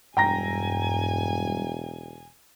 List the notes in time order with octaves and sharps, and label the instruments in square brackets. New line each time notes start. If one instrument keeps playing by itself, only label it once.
[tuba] E1 [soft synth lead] G2 [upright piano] G5 A#5 A#6 [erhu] G#5